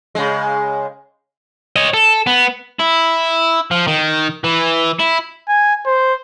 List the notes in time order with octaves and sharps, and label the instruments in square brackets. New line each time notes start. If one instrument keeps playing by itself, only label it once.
[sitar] C#3 G#3
[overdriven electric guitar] C#5 D#5
A4
B3
E4
F3
D#3
E3
E4
[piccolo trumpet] G#5
C5